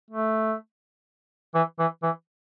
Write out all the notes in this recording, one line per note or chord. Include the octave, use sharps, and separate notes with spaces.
A3
E3
E3
E3